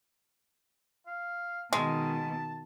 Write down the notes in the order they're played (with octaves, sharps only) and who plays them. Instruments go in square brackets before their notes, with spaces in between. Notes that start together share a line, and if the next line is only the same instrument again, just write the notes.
[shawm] F5
[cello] B2 D#3 [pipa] G#3 [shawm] A5